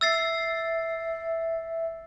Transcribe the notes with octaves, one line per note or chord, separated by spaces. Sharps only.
E5 E6 A6 C7